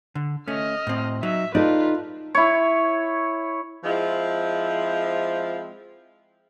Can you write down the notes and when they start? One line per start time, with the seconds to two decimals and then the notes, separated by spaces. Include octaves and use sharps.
0.15 D3
0.48 A3 C#4 D#5 F6
0.87 A2 C4
1.23 F#3 D#4 E5
1.55 D#4 F4 A4 B4 D5
2.35 E4 C#5
3.84 F3 G#3 C4 E4 F4